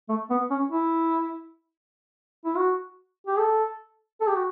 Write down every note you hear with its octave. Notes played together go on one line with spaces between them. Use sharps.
A3
B3
C#4
E4
E4
F#4
G4
A4
A4
G4
F#4